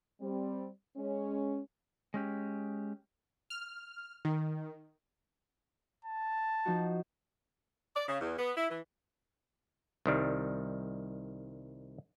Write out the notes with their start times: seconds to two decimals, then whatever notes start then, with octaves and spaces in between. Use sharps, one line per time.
0.21 G3 C4
0.97 G#3 C#4
2.14 G#3 C#4 G4
3.50 F6
4.25 D#3
6.05 A5
6.65 F3 D#4 F#4
7.96 D5
8.08 C#3
8.21 E2
8.39 B3
8.57 E4
8.69 E3
10.06 C2 D#3 G3